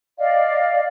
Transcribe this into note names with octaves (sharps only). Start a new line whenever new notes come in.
D5 D#5 F5